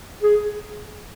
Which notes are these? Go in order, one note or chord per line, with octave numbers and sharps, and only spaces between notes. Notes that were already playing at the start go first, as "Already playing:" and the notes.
G#4